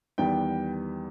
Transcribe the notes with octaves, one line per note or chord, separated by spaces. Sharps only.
E2 D#3 G3 B3 G5